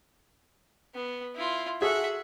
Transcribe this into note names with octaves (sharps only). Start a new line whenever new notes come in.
B3
E4 F4
F#4 G#4 A4 E5 F#5